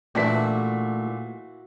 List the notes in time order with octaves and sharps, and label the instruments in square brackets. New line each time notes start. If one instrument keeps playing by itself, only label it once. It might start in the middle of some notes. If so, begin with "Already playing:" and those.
[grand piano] A#2 B6 [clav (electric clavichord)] E3 D4 G4 [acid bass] A3 [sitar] E4 F#4